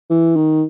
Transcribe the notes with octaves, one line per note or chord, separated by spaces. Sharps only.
E3
D#3